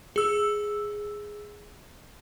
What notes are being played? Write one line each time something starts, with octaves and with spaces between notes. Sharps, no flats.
G#4 E6